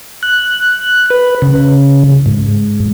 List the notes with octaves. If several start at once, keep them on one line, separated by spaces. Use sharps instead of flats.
F#6
B4
C#3
G#2